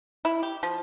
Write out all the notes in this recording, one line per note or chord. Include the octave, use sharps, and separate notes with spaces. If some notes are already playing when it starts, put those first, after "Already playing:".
E4
G4
F3